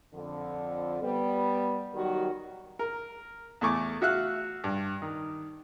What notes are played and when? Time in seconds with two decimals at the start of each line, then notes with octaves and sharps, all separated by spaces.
0.14 F2 D3
1.02 G3 B3
1.94 D#3 F#3 G3 F#4 A#4
2.79 A#4
3.61 E2 A3 G#5 C#6 D6
4.02 F#4 E5 F5 F#6
4.64 G2
5.02 D#3